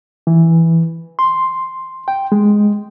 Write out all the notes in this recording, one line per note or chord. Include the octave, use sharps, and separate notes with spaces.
E3
C6
G5
G#3